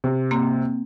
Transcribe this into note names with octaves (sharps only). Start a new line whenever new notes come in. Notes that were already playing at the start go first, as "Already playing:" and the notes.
C3
A#3 C4